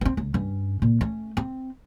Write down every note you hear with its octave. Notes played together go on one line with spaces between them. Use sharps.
B3 C4
C#2
G2 C#4
A#2
A3 C#4
C4